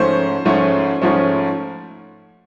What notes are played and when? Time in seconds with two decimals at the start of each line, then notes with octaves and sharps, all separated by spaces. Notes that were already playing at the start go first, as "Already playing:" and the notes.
Already playing: G#2 F3 A3 C#4 C5
0.45 G#2 F3 A3 C#4
1.02 G#2 F3 A3 C#4